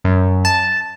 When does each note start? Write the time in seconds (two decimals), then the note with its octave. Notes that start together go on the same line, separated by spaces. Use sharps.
0.04 F#2
0.45 A5